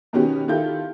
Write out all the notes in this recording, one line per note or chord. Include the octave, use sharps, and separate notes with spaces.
B2 D#3 B3 C#4 F#4 G4
D#3 E4 F4 G4 A4 G6